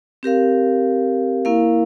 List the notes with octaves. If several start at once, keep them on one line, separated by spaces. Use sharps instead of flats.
C4 G4 A#4 F5
A#3 E4 A#4 F5